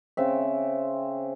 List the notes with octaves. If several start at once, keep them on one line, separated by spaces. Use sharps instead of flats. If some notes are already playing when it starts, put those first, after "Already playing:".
C#3 C4 E5